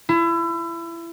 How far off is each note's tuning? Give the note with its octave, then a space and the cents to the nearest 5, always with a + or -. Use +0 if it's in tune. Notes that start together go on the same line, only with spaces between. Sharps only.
E4 +30